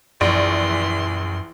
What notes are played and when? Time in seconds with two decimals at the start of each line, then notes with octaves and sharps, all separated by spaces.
0.21 A#1 F#2 E3 C6